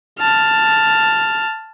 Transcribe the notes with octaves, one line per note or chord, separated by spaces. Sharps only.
A5 F6